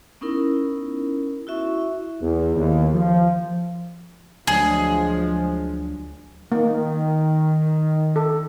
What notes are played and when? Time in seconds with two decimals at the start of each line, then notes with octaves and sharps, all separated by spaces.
0.21 B3 C#4 D#4 E4 A#4
1.47 E4 F#4 E5 C#6
2.21 E2
2.56 D#2
2.94 F3
4.47 D2 F3 F#3 G#3 D4 G#4
6.52 D#3 A#3
8.16 A4